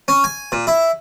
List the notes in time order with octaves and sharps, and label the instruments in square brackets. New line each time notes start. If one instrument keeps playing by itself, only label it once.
[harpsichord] C#4
G#5
A#2
E4